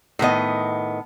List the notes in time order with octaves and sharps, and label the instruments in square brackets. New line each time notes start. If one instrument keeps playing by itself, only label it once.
[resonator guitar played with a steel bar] A2 D#3 B3 D#5